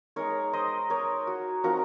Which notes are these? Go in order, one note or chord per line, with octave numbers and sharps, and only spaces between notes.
G#3 D#4 A#4 C#5
C5 D#5
A#4 C#5
F#4
F3 C4 D#4 F#4 A#4